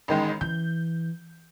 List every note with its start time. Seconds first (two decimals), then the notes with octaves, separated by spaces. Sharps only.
0.08 A1 D#3 G#3
0.41 E3 G6